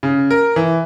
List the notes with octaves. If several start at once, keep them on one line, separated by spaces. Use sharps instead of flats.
C#3
A#4
E3